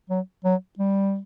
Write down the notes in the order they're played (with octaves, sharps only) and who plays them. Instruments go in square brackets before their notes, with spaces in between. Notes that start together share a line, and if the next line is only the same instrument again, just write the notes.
[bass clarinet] F#3
F#3
G3